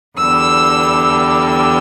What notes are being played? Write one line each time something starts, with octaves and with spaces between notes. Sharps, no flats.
E2 D3 G3 E6
E6